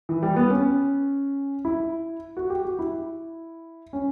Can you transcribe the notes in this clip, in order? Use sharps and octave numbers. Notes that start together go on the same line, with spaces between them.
E3
G3
B3
C#4
E4
F#4
G4
F#4
E4
C#4